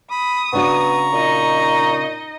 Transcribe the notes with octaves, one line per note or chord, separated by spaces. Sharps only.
B5 D#6
C#3 B3 D4 F#4 A#5 C#6
A#2 D#4 D#5